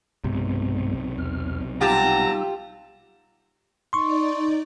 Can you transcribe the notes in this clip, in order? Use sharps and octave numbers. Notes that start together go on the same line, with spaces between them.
B1 G2 C3 G#3 B3
E2 F6
G3 D#4 F4 G4 F#5 A5 A#5 E6
D#4 D5 C6 C#6